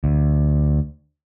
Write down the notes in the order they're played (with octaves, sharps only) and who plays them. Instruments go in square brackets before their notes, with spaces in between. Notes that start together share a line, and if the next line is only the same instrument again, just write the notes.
[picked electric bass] D2